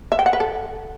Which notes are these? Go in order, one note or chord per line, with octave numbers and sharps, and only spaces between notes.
E5
G5
F#5
B4
A4